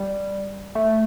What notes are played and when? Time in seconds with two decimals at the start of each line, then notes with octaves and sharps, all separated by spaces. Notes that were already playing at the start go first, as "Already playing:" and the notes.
Already playing: G3
0.75 A3